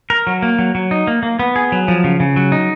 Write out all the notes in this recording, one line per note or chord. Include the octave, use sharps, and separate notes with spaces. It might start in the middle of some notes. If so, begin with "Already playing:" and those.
A#4
F#3
A#3
F#3
F#3
D#4
A#3
A#3
B3
G#4
F#3
F3
C#3
C#3
F#3
D#4